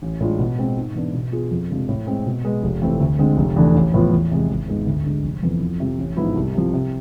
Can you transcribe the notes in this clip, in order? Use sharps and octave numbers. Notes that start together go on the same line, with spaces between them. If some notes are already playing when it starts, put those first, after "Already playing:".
A1
A2 G#3 D4 F4
B2
G#3 C4
G#2
E3 B3 D4
B2
B3 F4 G#4
F2
C3 F3 G#3 D4
A2
G#3 C4
B2
G#3 B3
F1
F2 E3 A3 C4
D2
D3 G#3 C4
F1
E2 D3 A3 D4
A1
A2 F3 B3 F4
E2
C3 G#3
G#1
G#2 G#3 B3
D2
D3 G#3
F1
F2 E3 B3 E4
F2
C3 F3
A1
G#2 F3 B3 E4
C2
C3 F3
C3